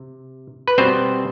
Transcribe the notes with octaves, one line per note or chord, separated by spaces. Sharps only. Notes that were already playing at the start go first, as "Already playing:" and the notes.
Already playing: C3
B4
B2 G3 B3 C4 C5